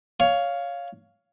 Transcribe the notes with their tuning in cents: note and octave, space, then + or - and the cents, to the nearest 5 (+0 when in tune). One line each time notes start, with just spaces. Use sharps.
C#5 +15 F5 +0